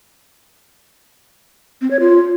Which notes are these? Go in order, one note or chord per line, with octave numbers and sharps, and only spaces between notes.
C4
C#5
F4